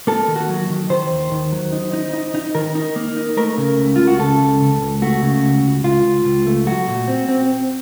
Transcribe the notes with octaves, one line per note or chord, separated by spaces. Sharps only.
A#3 A4
D#3
F#4
F#3
D#3
D#3 C5
D#2
D#3
F#3
D#4
D#4
D#4
D#4
D#3 A#4
D#4
A#3
D#4
A3 A#4
C#3
C#2
C#2 F4
F#4
C#3 A4
C#2
C#2
C#2
A3 F#4
C#3
C#2
C#2
C#2 F4
C#2
C#2
A3
F#3 F#4
A#2
C4
C4